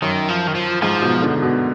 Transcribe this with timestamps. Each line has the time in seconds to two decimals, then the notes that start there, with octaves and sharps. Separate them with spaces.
0.02 F#2 D#3
0.29 F3
0.47 D#3
0.55 F3
0.82 G#2 F3
1.02 B2
1.22 D3
1.42 B2